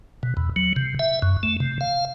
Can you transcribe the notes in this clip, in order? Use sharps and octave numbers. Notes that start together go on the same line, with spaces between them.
B2
E2
F#3
C3
E5
F#2
A3
C3
F5